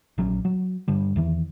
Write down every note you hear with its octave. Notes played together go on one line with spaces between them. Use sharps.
A#1 F#3 C#4
F#3
G2 D3 G3
E2 D#3 E3